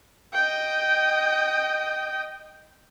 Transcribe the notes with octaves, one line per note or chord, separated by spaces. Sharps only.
D#5 G5